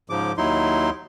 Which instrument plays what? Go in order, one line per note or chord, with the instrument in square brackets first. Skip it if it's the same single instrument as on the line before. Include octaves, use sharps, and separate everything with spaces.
[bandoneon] G#2 C#3 F3 D6
D#2 F#3 D#4 E4 C6